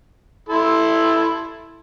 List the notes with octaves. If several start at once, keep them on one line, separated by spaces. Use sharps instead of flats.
E4 A4 C6